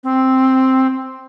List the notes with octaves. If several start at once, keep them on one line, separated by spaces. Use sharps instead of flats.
C4